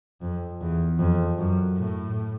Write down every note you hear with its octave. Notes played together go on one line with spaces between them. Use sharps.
F2
E2
F2
F#2
A2